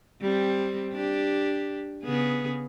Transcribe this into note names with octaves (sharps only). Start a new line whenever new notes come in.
G3 C4
D4 G4
C#3 B3 G#4